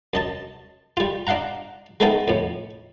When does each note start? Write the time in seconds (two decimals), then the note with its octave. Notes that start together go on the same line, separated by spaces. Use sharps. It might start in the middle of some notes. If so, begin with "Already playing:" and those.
0.14 F#2 D#5 A5
0.97 G3 F4
1.27 D4 D#5 F5 F#5 A#5
2.00 G#3 A3 B3 C4 D#4 A4
2.28 F2 A2